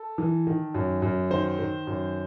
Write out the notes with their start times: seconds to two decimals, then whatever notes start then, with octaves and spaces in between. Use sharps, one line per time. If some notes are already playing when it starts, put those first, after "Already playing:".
Already playing: A4
0.18 E3
0.47 D#3
0.74 F#2
1.02 F#2
1.31 D#3 C5
1.59 D#3
1.87 F#2